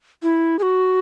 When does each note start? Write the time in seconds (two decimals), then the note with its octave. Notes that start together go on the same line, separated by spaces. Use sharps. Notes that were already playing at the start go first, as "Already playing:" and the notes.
0.23 E4
0.59 G#4
0.63 F#4